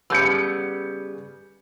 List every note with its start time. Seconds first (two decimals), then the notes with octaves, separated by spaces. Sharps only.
0.10 C#3 G3 B3 E6 G6 C#7